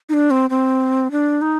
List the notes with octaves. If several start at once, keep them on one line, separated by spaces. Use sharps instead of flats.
D#4
D4
C4
C4
D4
D#4